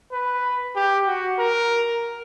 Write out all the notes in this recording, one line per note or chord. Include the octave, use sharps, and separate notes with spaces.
B4
G4
F#4
A#4